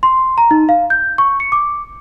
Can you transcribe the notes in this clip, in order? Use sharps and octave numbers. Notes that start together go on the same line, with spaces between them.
C6
A#5
D#4
F5
G6
C#6
C#7
D6